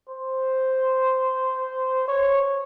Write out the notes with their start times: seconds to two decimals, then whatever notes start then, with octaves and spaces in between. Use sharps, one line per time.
0.09 C5
2.07 C#5